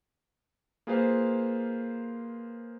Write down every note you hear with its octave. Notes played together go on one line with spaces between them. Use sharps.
A#3 F4 G#4 B4 C5 F5